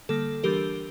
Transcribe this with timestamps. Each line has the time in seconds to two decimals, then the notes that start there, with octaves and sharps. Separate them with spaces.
0.09 D3 G3 A#3 A4
0.44 E3 G3 D4 G4 A#4